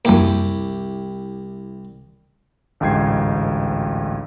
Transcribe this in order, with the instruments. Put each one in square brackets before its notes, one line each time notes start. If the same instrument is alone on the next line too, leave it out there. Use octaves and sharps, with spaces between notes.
[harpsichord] C2 E4 G4 [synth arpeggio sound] F#2 A#3
[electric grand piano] A1 D2 G#2 G5 G#6 C7